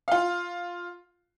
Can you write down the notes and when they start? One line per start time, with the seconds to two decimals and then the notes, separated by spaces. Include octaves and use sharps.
0.08 F4 F5